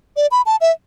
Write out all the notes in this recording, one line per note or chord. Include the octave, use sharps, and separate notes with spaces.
D5
B5
A5
E5